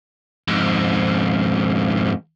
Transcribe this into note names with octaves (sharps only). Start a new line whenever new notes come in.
F2 G#2